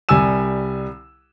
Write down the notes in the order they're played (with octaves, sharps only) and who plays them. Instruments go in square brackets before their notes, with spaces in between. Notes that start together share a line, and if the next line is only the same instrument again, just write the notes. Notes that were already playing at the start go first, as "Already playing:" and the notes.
[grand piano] C2 G3 G#5 E6 E7